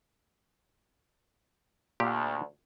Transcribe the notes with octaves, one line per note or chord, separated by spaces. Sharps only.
D2 A#2 G4